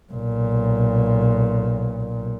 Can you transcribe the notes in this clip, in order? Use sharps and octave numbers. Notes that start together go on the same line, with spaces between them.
B1 A#2